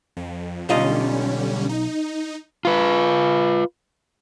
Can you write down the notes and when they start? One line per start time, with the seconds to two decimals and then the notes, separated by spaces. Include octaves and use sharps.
0.17 F2
0.69 B1 D3 G3 C#4 F4 D#5
1.69 D#4
2.65 F4 B4